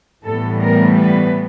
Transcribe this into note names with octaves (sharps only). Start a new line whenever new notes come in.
A2 E3 G3 B3 A4
A#4
B4